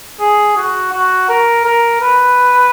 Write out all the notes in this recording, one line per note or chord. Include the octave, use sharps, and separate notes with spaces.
G#4
F#4
F#4
A#4
A#4
B4